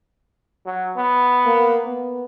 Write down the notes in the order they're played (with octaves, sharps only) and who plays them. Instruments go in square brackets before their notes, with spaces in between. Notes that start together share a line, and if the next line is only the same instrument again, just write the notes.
[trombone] F#3
B3
[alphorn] A#3
B3